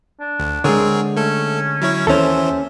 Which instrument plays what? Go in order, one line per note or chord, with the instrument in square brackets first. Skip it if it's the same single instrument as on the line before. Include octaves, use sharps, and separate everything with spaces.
[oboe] D4
[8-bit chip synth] D2
[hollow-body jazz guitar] D3 G#3 [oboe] C4 [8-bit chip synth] G#4 A#4 C#5
[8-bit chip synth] A3 A4 [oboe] C#4
[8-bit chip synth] F#3 E4 C#5
[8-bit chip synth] D#2 E3 C5 [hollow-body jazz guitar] C#4 A4 [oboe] E5